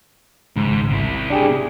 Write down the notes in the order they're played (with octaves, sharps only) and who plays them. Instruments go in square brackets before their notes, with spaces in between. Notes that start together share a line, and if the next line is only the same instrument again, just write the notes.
[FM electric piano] G#1 C#2 [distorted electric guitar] G#2
[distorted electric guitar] C3 E4
[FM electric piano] D4 G4 G#4